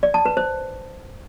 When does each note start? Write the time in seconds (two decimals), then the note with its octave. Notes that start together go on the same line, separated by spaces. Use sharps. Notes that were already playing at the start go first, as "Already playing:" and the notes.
0.03 D5
0.14 A5
0.26 B4
0.37 C5